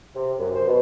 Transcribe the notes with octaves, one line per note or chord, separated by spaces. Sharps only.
C3
F#2
C5
B2